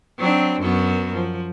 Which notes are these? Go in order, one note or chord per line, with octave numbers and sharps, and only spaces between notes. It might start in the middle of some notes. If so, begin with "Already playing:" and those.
F#3 C4 D4
F#2 B3 F#4
F3